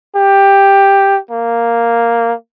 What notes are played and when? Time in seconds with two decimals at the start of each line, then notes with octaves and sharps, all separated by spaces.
0.16 G4
1.31 A#3